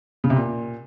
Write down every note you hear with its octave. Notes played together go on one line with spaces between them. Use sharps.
C#3
C3
A#2